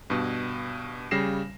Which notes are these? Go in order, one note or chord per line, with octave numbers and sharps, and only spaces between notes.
G2 B2
C#3 G3 A#6 C7 E7